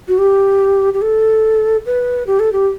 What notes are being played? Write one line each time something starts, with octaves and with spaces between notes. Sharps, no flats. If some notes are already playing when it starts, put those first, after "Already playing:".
F#4
G4
G4
A4
B4
G4
A4
G4